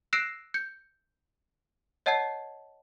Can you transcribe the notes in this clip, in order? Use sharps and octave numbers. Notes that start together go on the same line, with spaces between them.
E6 F#6 A#6 C7 D7 E7
G6 C#7
C#5 D#5 F#5 A5 G#6 C7